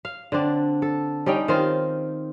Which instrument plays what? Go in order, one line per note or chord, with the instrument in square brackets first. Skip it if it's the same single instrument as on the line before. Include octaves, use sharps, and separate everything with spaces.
[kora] F5
D3 C4 D4
A4
G3 C#4 D#4 G5
D#3 C4 F4 C5